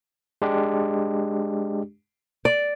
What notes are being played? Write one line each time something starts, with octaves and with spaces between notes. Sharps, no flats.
G#3 D4 G4
D5